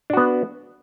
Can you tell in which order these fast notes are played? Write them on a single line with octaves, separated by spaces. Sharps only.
D4 F#4 B3